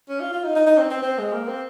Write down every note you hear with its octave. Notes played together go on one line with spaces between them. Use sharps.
C#4
F4
F4
D#4
D#4
D#4
C4
C4
C4
G#3
A#3
C4